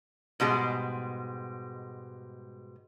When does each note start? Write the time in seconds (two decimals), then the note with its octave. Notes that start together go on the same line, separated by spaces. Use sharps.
0.40 G#2 B2 G3 G#3